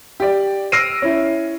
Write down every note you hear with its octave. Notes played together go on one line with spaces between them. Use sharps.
G4 D5
E6 F6 A#6 C7 D7 D#7
C#4 E4